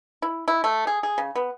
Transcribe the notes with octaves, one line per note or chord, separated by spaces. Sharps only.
E4
E4
A3
G#4
G#4
C#3
B3